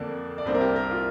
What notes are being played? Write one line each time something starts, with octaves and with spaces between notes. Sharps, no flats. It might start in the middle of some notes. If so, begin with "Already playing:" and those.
Already playing: F2 D3 A#3 D4 D5
D5
C2 C3 A#3 D4 C5
A#4
G4
A#4
F4